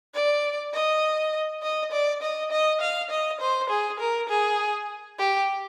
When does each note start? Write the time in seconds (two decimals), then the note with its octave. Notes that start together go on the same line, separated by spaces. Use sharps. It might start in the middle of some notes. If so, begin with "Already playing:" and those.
0.14 D5
0.74 D#5
1.62 D#5
1.92 D5
2.22 D#5
2.51 D#5
2.81 F5
3.10 D#5
3.41 C5
3.70 G#4
4.00 A#4
4.29 G#4
5.18 G4